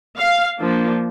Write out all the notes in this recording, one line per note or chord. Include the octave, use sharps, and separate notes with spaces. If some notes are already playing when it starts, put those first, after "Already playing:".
F5
F3 A#3 D4